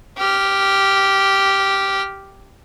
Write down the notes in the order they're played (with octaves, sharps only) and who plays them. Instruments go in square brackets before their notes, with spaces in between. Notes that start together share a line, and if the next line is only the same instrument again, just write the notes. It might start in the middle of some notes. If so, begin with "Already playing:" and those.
[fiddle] G4 F6